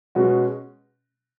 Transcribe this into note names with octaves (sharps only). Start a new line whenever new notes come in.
B2 G#3 C#4 F#4